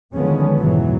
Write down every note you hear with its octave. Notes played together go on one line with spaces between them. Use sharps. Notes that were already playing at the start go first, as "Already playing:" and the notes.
D3 D#3 F3 G#3 B3 C#4
F2 G#2 B2 E3 F#3